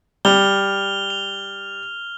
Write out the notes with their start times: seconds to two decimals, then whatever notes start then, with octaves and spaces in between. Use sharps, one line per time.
0.25 G3 F6 F7 G7
1.10 F7